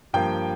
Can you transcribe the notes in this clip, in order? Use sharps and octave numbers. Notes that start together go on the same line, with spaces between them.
G2 F3 A#3 G5